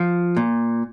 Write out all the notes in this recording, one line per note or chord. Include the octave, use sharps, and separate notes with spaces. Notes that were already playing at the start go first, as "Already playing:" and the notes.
Already playing: F3
A#2